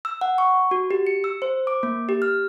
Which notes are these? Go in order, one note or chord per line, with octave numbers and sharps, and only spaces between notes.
E6
F#5
C#6
F#4
G4
C#7
E6
C5
D6
A#3
G4
F6